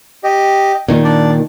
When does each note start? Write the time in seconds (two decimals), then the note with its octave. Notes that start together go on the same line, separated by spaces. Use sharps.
0.24 G4 D#5
0.88 A#2 D#3
1.04 D4 D5